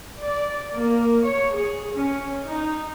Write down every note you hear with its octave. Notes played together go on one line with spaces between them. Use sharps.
D5
A#3
C#5
G#4
C#4
D#4